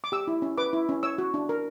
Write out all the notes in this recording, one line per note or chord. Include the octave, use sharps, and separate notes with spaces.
D6
G4 E6
E4
C#4
B4 D6
E4
C#4
C#5 E6
F#4
D4
A#4